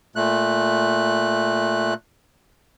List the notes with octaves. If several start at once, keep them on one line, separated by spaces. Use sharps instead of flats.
A#2 A3 F#6